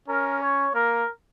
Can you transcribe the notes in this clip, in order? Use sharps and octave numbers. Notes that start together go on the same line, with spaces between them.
C#4 A#4
C#5
A#3 A#4